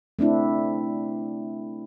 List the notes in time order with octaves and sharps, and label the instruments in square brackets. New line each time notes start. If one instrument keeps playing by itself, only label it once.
[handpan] A3 C4 D4 E4